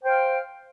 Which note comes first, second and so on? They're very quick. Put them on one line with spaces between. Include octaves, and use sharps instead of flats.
C5 G5 F5